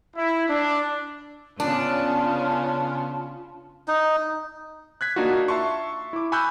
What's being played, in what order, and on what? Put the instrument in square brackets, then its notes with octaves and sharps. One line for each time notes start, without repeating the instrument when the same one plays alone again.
[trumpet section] E4
D4
[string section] C#3 B3 C#4 [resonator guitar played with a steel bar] D4 [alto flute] F4 [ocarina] A5
[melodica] D#4
[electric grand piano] F#6 G#6 B6
A#3 D4 D#4 F4 F#4
E5 A5 C6 C#6
E4 D6
G#5 B5 C#6 E6 F#6 G6